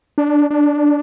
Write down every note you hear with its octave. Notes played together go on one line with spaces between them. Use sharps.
D4
D4